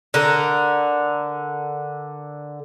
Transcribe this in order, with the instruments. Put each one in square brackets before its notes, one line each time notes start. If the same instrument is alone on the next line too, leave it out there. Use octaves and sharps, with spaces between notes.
[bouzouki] D3 A#4